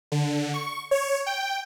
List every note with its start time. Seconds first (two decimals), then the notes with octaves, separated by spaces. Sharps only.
0.12 D3
0.54 C#6
0.91 C#5
1.26 G5